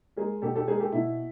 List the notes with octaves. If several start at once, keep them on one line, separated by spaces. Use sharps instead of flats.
G#3 G#4 A#4
B2 G4 A4
G4 A4
G#3 G#4 A#4
G4 A4
B2 E4